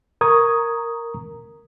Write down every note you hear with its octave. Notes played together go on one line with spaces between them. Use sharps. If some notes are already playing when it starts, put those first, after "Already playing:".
A#4 A#5 C#6 D#6 G#6